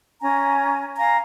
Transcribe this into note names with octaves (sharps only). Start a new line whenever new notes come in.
C#4 G#5 A#5
F5 G#5 A#5